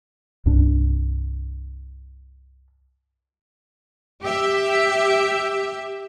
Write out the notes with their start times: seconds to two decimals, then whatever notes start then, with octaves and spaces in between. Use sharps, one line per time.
0.46 C2 G2 C3 D4
4.23 G4 E5